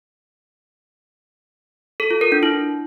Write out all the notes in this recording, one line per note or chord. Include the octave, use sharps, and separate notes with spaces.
A4
F4
A#4
D4
E4